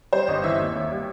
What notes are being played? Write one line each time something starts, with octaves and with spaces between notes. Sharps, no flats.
G3 C5
G1 D#5
E3 E5
D#2
D#2
G3